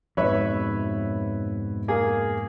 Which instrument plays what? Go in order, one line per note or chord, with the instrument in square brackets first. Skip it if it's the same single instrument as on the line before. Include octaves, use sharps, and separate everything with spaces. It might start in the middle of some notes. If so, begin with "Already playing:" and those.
[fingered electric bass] F2 G#2 B2 [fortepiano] B4 C#5 E5
[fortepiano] A#3 G#4